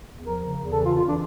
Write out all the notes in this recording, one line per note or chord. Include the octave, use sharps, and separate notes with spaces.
E2
F3 A#4
C#3
E2
E3 A4
F4
F2
F4
E3 D4